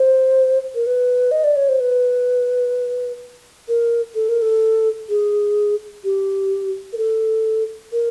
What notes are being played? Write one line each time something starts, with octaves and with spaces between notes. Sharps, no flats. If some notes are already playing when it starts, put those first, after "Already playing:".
Already playing: C5
A#4
B4
D#5
D5
C#5
C5
B4
A#4
A4
A#4
A4
G#4
G4
A#4
A4
A#4